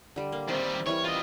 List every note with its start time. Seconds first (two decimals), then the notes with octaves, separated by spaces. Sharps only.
0.16 D3 G3
0.32 A#3
0.49 D#3 G3 C4
0.86 E3 G3 A#4 C#5
1.04 F4 D#5